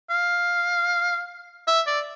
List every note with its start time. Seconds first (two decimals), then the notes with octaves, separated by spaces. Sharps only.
0.10 F5
1.67 E5
1.87 D5